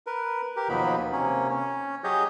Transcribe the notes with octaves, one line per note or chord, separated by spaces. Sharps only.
A#4 B4
G4 A#4
D#2 B2 F3 F#3 D#4 B5
C3 A#3 C#4
C#4
F#3 G4 G#4 C#5 D#5 G6